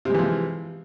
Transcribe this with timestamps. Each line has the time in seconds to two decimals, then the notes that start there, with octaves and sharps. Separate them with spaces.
0.05 C3
0.10 G#3
0.15 E3
0.19 F3